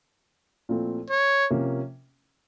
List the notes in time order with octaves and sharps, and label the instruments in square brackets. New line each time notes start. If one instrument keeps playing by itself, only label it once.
[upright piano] A#2 F3 A3 C4 E4
[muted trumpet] C#5
[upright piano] C3 F3 A#3 C#4